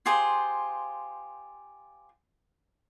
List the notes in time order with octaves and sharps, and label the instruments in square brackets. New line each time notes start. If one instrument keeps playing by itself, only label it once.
[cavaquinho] F4 G4 G#4 C5